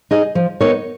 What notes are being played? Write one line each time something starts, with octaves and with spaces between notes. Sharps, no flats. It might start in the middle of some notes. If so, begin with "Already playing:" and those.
D#4 G#4 D#5
F3
B3 D#4 A#4 C#5